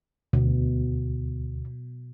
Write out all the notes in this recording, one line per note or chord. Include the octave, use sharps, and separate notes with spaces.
D2 B2